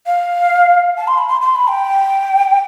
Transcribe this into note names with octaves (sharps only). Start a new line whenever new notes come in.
F5
A5
C6
B5
C6
C6
B5
G5